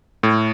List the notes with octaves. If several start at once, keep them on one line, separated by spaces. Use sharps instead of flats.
A2